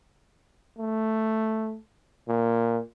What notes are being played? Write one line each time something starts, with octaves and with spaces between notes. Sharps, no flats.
A3
A#2